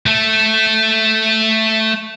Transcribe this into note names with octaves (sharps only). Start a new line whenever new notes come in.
A3 A4